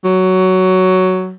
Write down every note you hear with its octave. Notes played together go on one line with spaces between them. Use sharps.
F#3